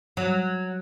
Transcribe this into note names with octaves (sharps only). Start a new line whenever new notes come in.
F#3